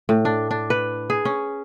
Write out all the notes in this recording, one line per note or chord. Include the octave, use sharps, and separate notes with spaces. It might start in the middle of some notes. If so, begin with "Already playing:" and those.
A2
D4
D4
B4
G#4
C#4